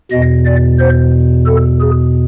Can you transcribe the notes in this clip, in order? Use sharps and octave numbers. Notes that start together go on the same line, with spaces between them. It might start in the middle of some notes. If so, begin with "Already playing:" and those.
E2 B2 D#5
D5
C5
A4
G#4